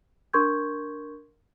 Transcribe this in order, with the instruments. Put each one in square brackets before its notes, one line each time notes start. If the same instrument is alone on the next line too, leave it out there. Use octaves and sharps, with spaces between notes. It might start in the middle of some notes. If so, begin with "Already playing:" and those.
[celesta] D4 A#4 C6 C#6 G6 G#6